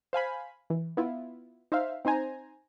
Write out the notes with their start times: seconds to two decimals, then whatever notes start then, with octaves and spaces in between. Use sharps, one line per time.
0.13 C5 F5 G#5 B5
0.70 E3
0.97 B3 E4 F4
1.72 D#4 C5 E5 F5
2.05 C4 D#4 C5 G#5 A#5